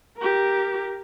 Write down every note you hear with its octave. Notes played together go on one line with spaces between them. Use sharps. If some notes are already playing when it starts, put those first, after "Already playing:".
G4 A#4